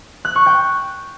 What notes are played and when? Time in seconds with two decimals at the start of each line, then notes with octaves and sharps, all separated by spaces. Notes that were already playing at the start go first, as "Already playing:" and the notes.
0.25 F#6
0.36 C#6
0.46 G5